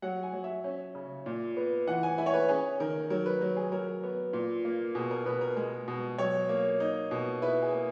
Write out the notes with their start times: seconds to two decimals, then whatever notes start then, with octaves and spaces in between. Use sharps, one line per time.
0.02 F#3 F#5
0.23 G#5
0.33 F#3
0.44 E5
0.64 C#4
0.95 C#3
1.26 A#2
1.57 B3
1.87 E3 F#5
2.03 G#5
2.18 E4 G#5
2.26 C#5
2.34 B4
2.48 C#4 G#4
2.80 D#3 A#4
3.10 F#3 A#4
3.26 B4
3.41 F#3
3.57 G#4
3.72 F#3 A#4
4.03 B3
4.33 A#2
4.65 A#3
4.95 B2 G#4
5.11 A#4
5.26 B2 B4
5.41 A#4
5.57 G#3
5.88 B2
6.18 F#3 C#5
6.49 A#3
6.80 D#4
7.11 B2
7.42 E4 B4
7.62 G#4
7.73 A#3